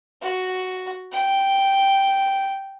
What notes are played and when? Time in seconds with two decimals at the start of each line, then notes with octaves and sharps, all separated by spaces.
0.21 F#4
1.12 G5